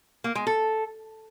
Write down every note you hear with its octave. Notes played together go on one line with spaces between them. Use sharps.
A#3
G#3
A4